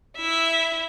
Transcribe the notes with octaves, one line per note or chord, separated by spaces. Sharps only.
E4 E5